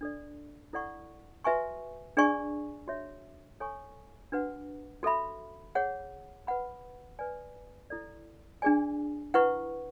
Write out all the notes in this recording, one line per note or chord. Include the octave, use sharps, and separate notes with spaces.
D4 A4 D5
E4 A4 D5 F#5 C#6
F#4 B4 E5 G#5 C#6
D4 G#4 D5 G#5 C#6
F#4 C#5 E5
A4 C#5 G#5 C#6
D4 F#4 B4 F#5
F#4 A4 E5 B5
G#4 C#5 F#5
B4 F#5 B5
B4 D5 G#5
E4 A4 D5
D4 G#4 D5 G#5
E4 B4 F#5 C#6